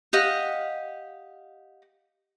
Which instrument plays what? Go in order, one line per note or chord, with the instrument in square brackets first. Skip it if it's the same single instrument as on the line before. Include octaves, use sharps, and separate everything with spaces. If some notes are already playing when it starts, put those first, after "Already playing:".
[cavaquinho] G4 D#5 F5 F#5